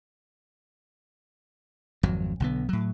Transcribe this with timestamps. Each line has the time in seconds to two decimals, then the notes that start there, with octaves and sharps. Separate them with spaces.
2.03 G#1 F2 F#3
2.40 B1 D3 B3
2.69 A2 F#3